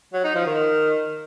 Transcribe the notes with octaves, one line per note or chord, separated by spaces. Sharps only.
F#3
D#4
F3
D#3